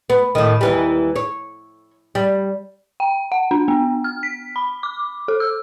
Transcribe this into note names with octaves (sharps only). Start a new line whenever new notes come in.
B3
A2 D#3
D#2 E3 G3
C#5
G3
G5
F#5
D4
B3
F6
B6
B5
D6
A4
E6